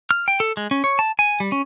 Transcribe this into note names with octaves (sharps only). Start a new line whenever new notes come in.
F6
G5
A4
G#3
C#4
C#5
A5
G#5
G3
C#4